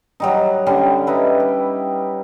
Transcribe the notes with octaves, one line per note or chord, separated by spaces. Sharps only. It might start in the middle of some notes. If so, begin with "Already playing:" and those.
F#3 G3 D#4
D3 G3 C#4
D#4 E4 B4
G5